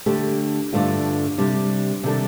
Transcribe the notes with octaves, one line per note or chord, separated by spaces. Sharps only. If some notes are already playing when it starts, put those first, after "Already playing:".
D3 A3 D4 G4
G2 D3 A3 D4 F4
C3 G3 D4
C3 D#3 G3 D4 A4